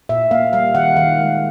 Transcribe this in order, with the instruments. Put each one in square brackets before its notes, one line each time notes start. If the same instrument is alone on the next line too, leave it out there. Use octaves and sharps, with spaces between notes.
[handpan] A#2 E5
A#3 F5
G3 F5
D#3 F#5
D#3 F5
G#3